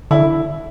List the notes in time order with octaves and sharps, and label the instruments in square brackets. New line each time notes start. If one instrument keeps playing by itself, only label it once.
[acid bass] D3 [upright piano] E4